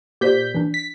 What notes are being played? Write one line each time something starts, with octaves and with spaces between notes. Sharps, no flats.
A#2 G4 C5 D5 G6 B6
E3 D4
B6